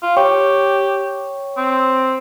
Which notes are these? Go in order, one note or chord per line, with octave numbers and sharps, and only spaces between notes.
F4
G4 C#5 G5 C#6
C4